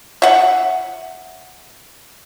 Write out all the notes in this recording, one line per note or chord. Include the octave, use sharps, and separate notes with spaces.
E5 F#5